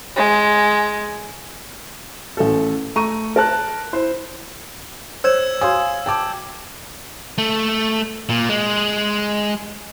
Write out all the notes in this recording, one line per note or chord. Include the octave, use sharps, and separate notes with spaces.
G#3
A1 A4
A3 A#5 C#6 D#7
A#4 A5 F#6
E4 C5
C5 C#5 E6 G#6 E7
F#4 C#5 F5 G#5 D#6
G5 A5 D6
A3
A#2
G#3